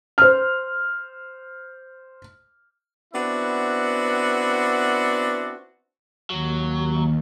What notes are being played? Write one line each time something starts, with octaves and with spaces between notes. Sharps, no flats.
C5 F6
B3 C4 D4 E4 F#4
D#2 F#3